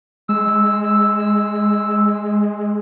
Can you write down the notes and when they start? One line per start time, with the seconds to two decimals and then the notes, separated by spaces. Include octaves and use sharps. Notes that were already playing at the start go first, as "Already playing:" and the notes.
0.29 G#3 E6